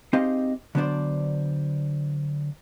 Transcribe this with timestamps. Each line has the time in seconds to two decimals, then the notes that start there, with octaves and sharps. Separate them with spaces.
0.13 C4 D#4 G4 G#4 D#5 F5
0.75 D3 F#3 B3 D4 C5 D5